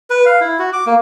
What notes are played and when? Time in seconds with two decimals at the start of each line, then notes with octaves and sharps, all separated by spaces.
0.10 B4
0.26 F5
0.41 E4
0.59 F#4
0.73 D6
0.87 A#3